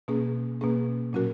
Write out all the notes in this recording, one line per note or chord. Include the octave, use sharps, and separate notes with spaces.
B2 A#3 C#4 G#4
B2 A#3 C#4 G#4
A#2 F#3 C#4 F#4 A#4